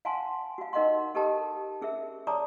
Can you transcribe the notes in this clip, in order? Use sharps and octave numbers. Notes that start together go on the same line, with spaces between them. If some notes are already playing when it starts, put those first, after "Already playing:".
F5 F#5 G#5 A5 C6
F#4 F5
D#4 A#4 D#5 F5 F#5 C6
G4 A4 A#4 D#5 G5 A5
C#4 G#4 A#4 E5
C#5 D5 A5 A#5 D6 D#6